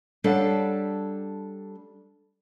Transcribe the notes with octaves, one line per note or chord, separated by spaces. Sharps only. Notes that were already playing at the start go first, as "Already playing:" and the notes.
G3 D4 A4 C#5 F5 F#5